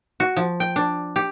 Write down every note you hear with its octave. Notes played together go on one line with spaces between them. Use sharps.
F#4
F3
G5
D4
G4